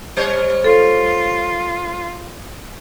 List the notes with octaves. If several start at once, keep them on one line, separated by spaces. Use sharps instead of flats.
G3 C5 C#5
F4 A4